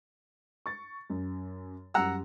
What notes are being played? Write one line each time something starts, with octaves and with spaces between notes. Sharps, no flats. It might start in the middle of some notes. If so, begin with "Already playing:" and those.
C#6 A6
F#2
F#2 G3 F#5 A#5 E6